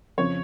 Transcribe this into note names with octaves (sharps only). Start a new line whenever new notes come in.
F2 C#3 F3 C#5